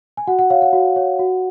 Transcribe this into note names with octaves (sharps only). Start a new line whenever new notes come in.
G#5
F#4 F#5
F#5
C#5 F5
F#5
F#4
C#5
F#4